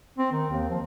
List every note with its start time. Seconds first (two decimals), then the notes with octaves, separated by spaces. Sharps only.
0.18 C4
0.32 D#3
0.50 D#2
0.69 F3